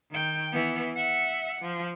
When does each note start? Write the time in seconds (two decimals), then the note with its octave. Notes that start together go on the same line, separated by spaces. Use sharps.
0.11 D#3 G5
0.52 E3 B3
0.96 E5 F#5
1.61 F3